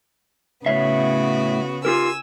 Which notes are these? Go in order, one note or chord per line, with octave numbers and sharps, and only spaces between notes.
A2 C#3 B3 F#4 C#5 E5
F4 G4 A#4 G#5 E6